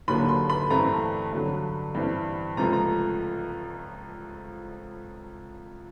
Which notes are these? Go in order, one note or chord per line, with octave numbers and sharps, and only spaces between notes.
D#2 D3 F#3 A#3 B5
C6
B5
G2 E3 A3 C4 A#5
G2 D3 F#3
G2 E3 G3 C4
C#2 C3 F3 A3 A#5
A#5